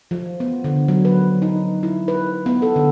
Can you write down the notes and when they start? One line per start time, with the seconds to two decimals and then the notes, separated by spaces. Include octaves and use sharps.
0.11 F3
0.40 B3
0.64 D3
0.88 F#3
1.05 B4
1.42 D#4
1.83 E4
2.08 B4
2.46 B3
2.62 A4
2.76 D3